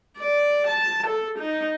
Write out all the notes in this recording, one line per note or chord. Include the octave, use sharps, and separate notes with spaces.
D5
A5
A4
D#4